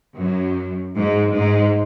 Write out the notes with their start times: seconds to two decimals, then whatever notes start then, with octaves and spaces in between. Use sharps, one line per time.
0.17 F#2
0.93 G#2
1.32 G#2